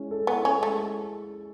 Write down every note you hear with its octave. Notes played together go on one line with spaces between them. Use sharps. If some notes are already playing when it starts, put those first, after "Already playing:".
Already playing: G#3 C#4 E4
A4
B3
E4
C#4
G#3
A3